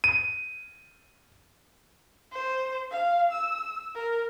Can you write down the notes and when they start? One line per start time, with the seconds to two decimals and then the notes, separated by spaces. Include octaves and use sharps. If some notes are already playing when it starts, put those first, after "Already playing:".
0.04 D#7
2.32 C5
2.91 F5
3.32 E6
3.95 A#4